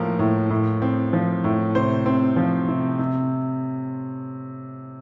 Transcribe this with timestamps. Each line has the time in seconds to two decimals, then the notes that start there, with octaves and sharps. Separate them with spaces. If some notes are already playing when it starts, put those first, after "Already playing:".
Already playing: A2 F3 A#3 A#4
0.19 A2
0.50 A2
0.82 C4
1.13 F3
1.44 A2
1.75 C3 C5
2.06 C4
2.36 F3
2.68 C3
2.99 C3